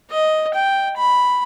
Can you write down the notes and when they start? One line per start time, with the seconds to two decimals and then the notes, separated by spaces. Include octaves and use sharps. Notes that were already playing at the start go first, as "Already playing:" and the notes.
0.10 D#5
0.54 G5
0.97 B5